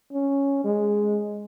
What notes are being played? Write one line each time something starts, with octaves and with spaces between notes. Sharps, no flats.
C#4
G#3